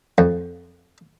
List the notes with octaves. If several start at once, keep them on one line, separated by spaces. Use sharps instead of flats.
F2